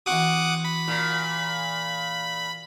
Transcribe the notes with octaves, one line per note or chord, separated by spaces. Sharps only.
E3 C4 F#4 F#5 D6 D#6
B5
A#2